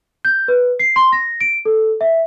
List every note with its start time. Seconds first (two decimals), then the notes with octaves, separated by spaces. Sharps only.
0.25 G6
0.48 B4
0.79 C7
0.96 C6
1.12 A#6
1.41 D7
1.65 A4
2.01 E5